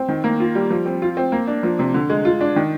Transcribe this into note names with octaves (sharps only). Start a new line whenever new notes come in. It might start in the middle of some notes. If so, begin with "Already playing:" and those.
Already playing: C4
D#3
A#3
F4
G3
F3
C4
F4
C4
A#3
D4
F3
C3
D3
G#3
F4
D4
D#3